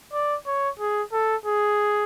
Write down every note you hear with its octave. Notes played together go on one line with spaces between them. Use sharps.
D5
C#5
G#4
A4
G#4